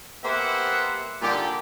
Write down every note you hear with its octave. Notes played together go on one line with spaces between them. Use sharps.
A#3 B3 G4 C5 E5 F#5
A#2 D3 G3 D#4 G4